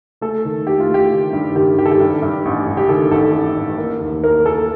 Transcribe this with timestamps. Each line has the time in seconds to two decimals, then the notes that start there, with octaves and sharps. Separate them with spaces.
0.21 A3 A4
0.45 D#3
0.66 A3 G4
0.80 F4
0.89 A3 G4
1.12 D#3
1.33 G2
1.55 D#3 G4
1.77 D#3 G4
1.86 A4
1.91 G4
2.00 G2
2.22 G2
2.45 A1
2.67 G2
2.77 G4
2.89 D#3 A4
3.11 A1 A4
3.34 A1
3.56 A1
3.78 A#3
4.01 D#2
4.24 A#3 A#4
4.45 A#3 A4